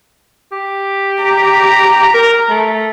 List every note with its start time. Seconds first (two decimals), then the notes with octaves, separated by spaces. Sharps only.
0.52 G4
1.23 A#5
2.14 A#4
2.50 A3